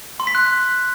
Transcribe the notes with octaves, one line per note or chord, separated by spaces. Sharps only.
C6
B6
F#6